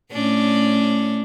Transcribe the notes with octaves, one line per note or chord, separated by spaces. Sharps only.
A2 C#4 D4